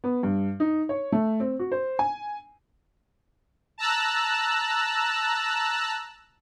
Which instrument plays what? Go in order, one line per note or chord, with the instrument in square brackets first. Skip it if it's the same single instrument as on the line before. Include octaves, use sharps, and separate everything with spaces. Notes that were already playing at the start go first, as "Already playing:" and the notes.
[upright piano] B3
G2
D#4
C#5
A3
C4
F#4
C5
G#5
[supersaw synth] A5 A#5 E6 F#6